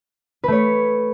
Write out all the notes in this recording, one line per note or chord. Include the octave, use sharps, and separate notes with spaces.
A3 B4 C#5